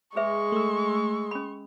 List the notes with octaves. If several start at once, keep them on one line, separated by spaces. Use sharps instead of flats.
G#3 G#4 B4 E5 C#6
A3 E6
C#4 B5